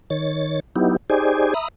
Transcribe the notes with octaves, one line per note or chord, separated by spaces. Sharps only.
D#3 C#5 A6
F#3 B3 D#4 E4 G4
D#4 G4 G#4 C5 D5 G#5
E5 A#5 B5 D#6